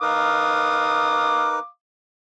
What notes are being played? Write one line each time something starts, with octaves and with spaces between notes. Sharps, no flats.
D#4 A#4 B4 F5 D6 D#6